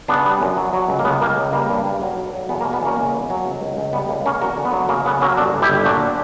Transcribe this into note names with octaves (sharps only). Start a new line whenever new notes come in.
C#3 B3 D4
G3
F#2
F#3
F#3
C#2
A#3
C#2 B3
C#2 A#3
C#2
G3 A#3
G2
G2
F#3
B1
F#3
E2 B3
A#3
B2
B3
E2 A#3 C#4
C#2
C#2
F#3
C#2
C#2
C#2
G3 B3
C#2 A#3
C#2 A#3 C#4
E2 F#4 A#4
D3
B3
F#3
C#3 A#3
C#3 B3
F#3 A#3 C#4
G1 D4 F#4
G1
E4 G4
G1
A#2 D4 F#4